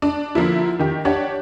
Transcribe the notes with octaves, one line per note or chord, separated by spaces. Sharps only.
D4
D3 F3 A#3 E4
D#3 G4
D4 G4 C#5 F#5